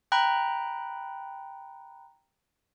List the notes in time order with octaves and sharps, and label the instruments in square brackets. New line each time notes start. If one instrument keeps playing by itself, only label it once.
[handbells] G5 A#5 B5 F#6